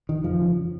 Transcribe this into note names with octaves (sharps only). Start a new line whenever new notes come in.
D#3
F2 F3
C#3